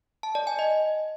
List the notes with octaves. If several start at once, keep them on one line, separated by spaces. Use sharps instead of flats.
A5
D5
G#5
D#5